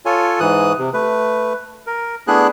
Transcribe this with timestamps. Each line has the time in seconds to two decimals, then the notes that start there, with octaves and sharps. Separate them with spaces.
0.06 F4 A4 C#5 G#5
0.40 G#2 E3 D#6 F#6
0.78 C3
0.93 A3 B4
1.87 A#4
2.28 A3 B3 D4 E4 G#4 F#6